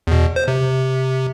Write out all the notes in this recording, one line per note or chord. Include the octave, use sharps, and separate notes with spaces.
E2 B2
C5
C3